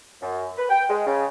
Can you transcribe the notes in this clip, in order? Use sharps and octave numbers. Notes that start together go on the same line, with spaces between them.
F#2
B4
G5
G#3
C#3